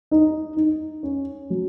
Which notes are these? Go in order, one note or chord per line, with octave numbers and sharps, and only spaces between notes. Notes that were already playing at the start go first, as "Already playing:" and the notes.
D#4
D#4
C#4
F#3